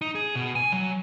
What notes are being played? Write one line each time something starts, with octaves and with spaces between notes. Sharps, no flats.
D#4
G#4
B2
G#5
F#3